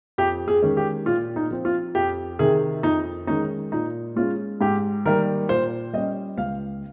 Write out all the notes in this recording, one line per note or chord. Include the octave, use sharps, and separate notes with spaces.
F2 G4
G#4
D#3 G#3 C#4
G4
A#2 F4
D#4
F3 C4
F4
F2 G4
C3 D#3 G#4
F2 D#4
D#3 G#3 C#4 D#4
A#2 D#4
G#3 C#4 F4
G#2 G4
D#3 G3 A#3 A#4
A#2 C5
G3 C#4 D#5
C#2 F5